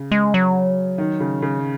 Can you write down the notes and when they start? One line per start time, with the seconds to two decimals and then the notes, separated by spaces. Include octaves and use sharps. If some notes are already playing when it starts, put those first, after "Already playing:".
Already playing: C#3
0.11 G#3
0.34 F#3
0.98 D#3
1.20 C#3
1.42 C#3